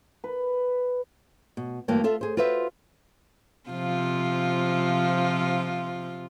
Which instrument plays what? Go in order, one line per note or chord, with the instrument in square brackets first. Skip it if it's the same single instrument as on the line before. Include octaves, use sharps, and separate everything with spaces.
[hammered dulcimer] B4
[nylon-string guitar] B2
D2 G2 E3 A#3 G5 A5
F4 A4 E5
G#4 C5
F4 F#4 B4 C5 E5
[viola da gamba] C3 F3 F4